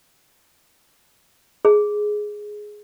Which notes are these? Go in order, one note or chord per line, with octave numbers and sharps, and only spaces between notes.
G#4